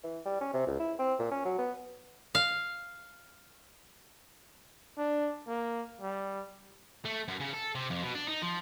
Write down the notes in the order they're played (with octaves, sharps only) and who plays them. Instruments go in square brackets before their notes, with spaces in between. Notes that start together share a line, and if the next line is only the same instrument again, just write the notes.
[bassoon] E3
G3
C#4
C3
C#2
E4
C4
A#2
C#4
F#3
B3
[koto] F5
[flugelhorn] D4
A#3
G3
[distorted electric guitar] A3
F#2
C#3
A4
C3
F2
B2
D4
D#4
F3